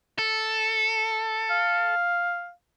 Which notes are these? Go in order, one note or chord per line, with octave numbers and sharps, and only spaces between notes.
A4
F5